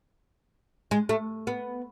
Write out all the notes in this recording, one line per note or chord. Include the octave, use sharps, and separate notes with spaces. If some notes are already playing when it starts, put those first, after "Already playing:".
G#3
A3
B3